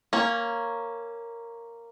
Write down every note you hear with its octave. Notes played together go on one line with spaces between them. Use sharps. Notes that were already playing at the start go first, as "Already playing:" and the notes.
A#3 C#4